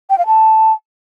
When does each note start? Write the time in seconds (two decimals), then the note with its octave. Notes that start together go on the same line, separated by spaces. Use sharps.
0.10 G5
0.18 F5
0.27 A5